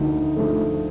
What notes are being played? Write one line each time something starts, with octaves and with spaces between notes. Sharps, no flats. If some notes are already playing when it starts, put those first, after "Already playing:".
Already playing: D2 D3 D#3 F3 D#4
D3 F3 A3